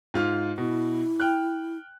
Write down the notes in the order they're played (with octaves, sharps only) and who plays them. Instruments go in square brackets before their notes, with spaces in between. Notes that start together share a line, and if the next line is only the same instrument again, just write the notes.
[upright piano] G#2 F4 F6
[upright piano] B2 [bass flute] E4
[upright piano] G5 F6 F#6